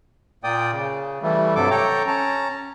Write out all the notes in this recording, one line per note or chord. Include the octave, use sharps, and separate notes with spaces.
A#2 A#3 D5 G5 D#6
C#3
E3 G3 A3
G2 C3 F#3 A4 D6
A4 C#5 G5 A#5
C#4 A5 A#5